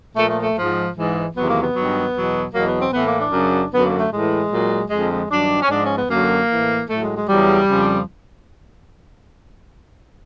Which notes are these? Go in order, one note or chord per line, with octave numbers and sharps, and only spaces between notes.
A#2 F3 A3
A3
A3
G#2 F3
G#2 E3
E2 C3 D#3 F#3 B3
A#3
B3
G2 D#3 F#3
E2 B2 F#3
E2 B2 F#3 A#3
B3
C4
A2 E3 B3
A#3
D4
F#2 C#3 F#3
F#2 D3 F#3 B3
A#3
A3
A2 E3 G#3
A#2 F#3
F2 D3 F3 G#3
G#3
G2 D#3 F#3 D4
C#4
G#2 F3 D4
C#4
B3
F#2 D3 F#3 A#3
A2 E3
A2 F#3 A3
G#3
G#3
E2 C#3 F#3 G3
F2 C#3 F3